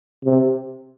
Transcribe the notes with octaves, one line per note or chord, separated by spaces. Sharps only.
C3